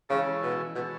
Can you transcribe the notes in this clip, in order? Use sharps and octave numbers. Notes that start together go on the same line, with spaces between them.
C#3 E3 G#3 C#4 E4 A4
B2
B2 E3 G#3 C#4 E4 A4